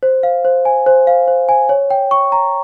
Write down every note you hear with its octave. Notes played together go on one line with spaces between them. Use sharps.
C5
F5
C5
G#5
C5
F5
C5
G#5
C#5
G5
C#6
A#5